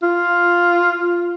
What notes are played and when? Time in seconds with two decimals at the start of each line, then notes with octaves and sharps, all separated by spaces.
0.03 F4